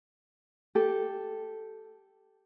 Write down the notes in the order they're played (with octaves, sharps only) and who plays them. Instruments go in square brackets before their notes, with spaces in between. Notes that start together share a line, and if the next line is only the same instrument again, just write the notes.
[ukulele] G4 A4